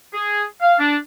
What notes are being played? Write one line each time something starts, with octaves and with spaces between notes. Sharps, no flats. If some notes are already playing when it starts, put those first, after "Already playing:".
G#4
F5
D4